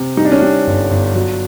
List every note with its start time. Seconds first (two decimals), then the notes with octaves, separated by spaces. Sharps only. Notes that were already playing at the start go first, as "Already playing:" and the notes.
Already playing: C3
0.17 G3 D#4
0.25 D4
0.32 C#4
0.39 G3 D4
0.67 G1
0.90 G1
1.14 F#3